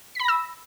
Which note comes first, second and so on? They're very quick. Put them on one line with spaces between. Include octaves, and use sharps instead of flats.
B6 B5 A#6 E6